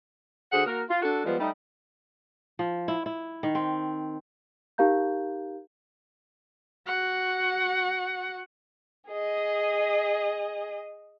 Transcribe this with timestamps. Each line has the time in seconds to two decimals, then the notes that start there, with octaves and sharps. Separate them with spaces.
0.52 D3 F#4 G#4 C5 F#5
0.67 A#3 F#4 A#4
0.90 F4
1.03 D4 F#4 A4
1.25 F3 G3 G#3 B3
1.40 G3 A3 D#4
2.59 F3
2.88 E4
3.06 E4
3.43 D#3
3.55 C4
4.78 D#4 G4 A#4 F5 A#5 G6
6.86 F#4 F#5
9.08 G#4 D#5